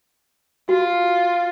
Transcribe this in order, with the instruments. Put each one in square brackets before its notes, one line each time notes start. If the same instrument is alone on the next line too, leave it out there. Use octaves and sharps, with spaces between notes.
[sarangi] F4 [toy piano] F#4